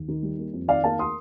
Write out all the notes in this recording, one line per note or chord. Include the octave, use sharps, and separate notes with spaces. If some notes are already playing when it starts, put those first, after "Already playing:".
Already playing: D#2
D#3
G3
A#3
F2
D#3 D5 F5
A#3 F5 A5
C6 D#6